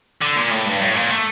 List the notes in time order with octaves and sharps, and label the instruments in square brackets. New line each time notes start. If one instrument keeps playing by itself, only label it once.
[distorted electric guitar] D3
A#2
A2
G2
A2
A#2
A3